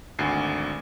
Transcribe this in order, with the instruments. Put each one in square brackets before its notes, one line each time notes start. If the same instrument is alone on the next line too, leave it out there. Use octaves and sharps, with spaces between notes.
[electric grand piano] G#1 D2 C7